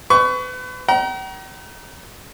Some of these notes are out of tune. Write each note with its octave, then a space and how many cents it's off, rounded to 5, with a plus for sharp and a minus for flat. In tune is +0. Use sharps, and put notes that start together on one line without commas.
B4 +35 C#6 +25
G5 -45 A#5 +25